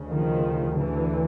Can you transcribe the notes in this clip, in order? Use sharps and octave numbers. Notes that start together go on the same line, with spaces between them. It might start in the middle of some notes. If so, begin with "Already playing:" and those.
Already playing: D2 C#3
D#3 F3
D3 E3